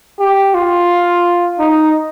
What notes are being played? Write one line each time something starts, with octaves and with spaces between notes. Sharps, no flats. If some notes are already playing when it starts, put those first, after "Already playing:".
G4
F4
D#4